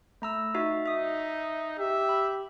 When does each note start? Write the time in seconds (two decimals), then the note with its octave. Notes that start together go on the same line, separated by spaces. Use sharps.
0.22 A3 A#5 E6
0.54 D#4 F#4 E5
0.86 D#4 E5 D#6
1.79 G4 E5
2.09 B5